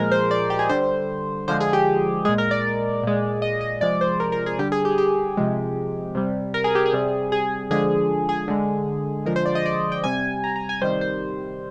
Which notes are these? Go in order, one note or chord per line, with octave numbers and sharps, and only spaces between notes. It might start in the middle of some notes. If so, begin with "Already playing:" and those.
Already playing: A#2 F3 G#3 A#4
C5
D5
G4
G#4
D3 G3 C5
D3 F3 G#3 C5
G#4
G4
A#2 G#3 G#4
A#4
D5
A#2 G#3
D#5
D#5
C3 F3 G#3 D5
C5
A#4
A#4
G#4
D3 G3 G4
G#4
G4
G4
C3 F3 G#3
C3 G3
A#4
G#4
G4
G#4
C3 G3
G#4
D3 F3 G#3 G#4
G#4
D3 G#3
D3 F3 G#3 A#4
C5
D5
D#5
D5
G5
C3 G3 G#5
A#5
A#5
G#5
C3 D#3 G3 C5
C5